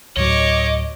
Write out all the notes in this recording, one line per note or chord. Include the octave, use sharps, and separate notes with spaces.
D2 A2 F#3 C#5 D#5 D6